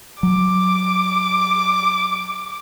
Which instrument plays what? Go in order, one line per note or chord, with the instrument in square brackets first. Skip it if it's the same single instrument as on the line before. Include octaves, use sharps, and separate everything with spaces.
[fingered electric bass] F#3 [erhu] D6